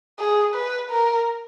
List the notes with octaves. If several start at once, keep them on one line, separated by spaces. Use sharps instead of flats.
G#4
B4
A#4